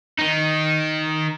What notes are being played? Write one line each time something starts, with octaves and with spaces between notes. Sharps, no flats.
D#3 D#4